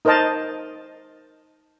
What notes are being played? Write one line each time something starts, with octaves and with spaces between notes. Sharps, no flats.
D#4 A#4 C5 D#5 A5